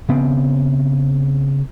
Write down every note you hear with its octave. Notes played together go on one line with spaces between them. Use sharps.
C#3 B3 C4